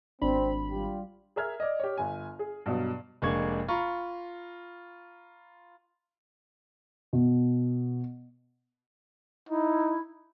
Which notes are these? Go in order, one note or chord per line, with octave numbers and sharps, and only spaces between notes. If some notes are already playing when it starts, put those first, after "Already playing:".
G#1 C4 D4 B5
G3 F4 G4
G#4 A#4 E5 F6 G#6
D5 D#5
G4 C#5
G1 G#5
G#4
G2 B2 F#3
F1 G#3 A#3 D4 C#6 G#6
F4 A#5 B5 C#6
B2
D#4 E4